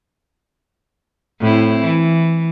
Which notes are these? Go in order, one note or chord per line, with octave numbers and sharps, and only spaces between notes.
A2 C4 E4
E3